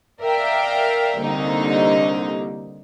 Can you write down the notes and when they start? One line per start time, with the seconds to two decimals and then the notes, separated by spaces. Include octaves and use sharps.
0.22 A#4 D5 E5 F5 G5
1.22 C2 D3 A#3 D#4